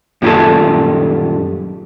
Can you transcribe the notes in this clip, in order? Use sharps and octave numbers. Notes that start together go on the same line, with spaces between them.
F#2 A#2 D#3 G3 G#4 A4